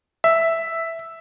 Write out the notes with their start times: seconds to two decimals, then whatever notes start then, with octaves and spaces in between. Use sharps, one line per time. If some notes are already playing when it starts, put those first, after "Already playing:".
0.24 E5